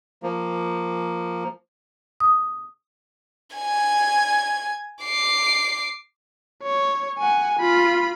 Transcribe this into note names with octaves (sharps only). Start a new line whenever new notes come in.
F3 A#3
D#6
G#5 G#6
D6 C7
C#5
F#5 G#5
F4 B5